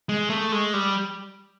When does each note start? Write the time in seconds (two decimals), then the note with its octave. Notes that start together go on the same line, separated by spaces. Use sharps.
0.09 G#3
0.30 A3
0.52 G#3
0.73 G3